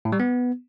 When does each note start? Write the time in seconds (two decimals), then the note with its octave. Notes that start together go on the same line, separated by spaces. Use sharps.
0.05 A2
0.12 G3
0.20 B3